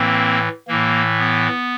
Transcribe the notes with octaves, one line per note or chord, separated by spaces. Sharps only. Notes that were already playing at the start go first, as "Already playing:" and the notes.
Already playing: A2 E3 A#3 C4
A2 E3 A#3
B3